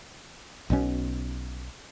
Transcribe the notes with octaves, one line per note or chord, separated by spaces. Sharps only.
B1 B2 G3 C#4